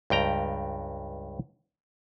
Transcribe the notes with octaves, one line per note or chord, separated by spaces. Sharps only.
C#2 G2 G5 A#5